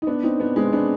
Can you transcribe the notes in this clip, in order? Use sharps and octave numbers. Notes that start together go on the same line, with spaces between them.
D#4
B3 D4
C4 D#4
B3 D4
G#3 C4
B3 D4